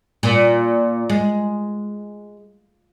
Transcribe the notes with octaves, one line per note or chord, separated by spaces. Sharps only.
A#2
G#3